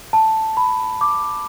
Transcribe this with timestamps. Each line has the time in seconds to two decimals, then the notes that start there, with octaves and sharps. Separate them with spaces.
0.13 A5
0.57 B5
1.01 D6